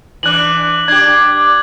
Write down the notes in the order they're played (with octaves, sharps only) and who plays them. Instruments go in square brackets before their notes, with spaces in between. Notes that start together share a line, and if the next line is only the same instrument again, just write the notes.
[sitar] E3 D4 [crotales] F#6 F#7
[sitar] D4 G4 [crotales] G#6